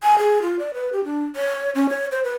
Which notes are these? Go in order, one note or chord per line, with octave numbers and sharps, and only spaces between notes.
G#5
G#4
F4
D5
B4
G4
D4
C#5
C#4
C#5
C5
B4